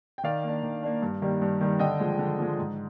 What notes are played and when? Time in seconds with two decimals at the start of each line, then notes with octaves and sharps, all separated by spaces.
0.18 G5
0.23 D#3 D5 F5
0.43 A#3
0.48 D4
0.63 D#3
0.83 A#3 D4
1.02 G2
1.22 D#3 G3 A#3
1.42 G2
1.61 D#3 G3 A#3
1.79 D3 D#5 G5
1.99 F3 G#3
2.19 D3
2.39 F3 G#3
2.59 G#2